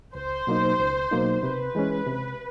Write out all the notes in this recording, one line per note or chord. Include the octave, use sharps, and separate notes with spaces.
C#2 C5
B2 F#3 A#3 D#4
C#2
B2 F#3 A#3 D#4
C3 B4
E3 G#3 C#4
C3